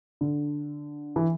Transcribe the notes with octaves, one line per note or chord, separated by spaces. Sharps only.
D3
E3